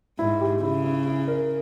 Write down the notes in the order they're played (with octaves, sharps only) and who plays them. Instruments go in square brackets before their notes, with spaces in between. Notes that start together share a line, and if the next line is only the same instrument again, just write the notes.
[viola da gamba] G#2 [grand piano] E4
[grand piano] G4
[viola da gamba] C#3 [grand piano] E4
[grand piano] E4
E4
A#4